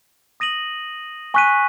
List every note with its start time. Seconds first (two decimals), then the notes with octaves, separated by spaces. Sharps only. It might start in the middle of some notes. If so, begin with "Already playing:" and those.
0.40 D#6 A#6 D#7 F#7
1.34 G#5 C#6 F#6 B6 D#7